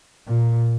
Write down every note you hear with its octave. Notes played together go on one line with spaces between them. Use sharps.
A#2